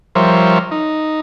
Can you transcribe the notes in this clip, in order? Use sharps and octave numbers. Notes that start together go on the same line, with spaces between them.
F3 G3 A#4 C5 C#5 E5
D#4